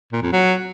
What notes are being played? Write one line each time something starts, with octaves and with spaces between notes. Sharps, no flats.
A#2
F2
F#3